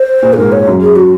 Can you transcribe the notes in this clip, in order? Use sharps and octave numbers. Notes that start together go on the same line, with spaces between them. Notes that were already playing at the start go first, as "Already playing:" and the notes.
Already playing: C5
A#2
G#4
G#2 A#4
C#5
F#2
G#4
F#4